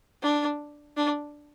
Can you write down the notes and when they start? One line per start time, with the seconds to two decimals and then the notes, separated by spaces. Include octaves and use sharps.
0.23 D4
0.97 D4